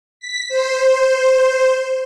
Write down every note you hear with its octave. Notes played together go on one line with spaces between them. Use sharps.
B6
C5